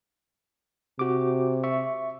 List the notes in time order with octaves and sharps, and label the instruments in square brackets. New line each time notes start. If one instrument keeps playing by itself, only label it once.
[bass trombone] C3 [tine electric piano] F#4 D6
[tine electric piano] E5 C#6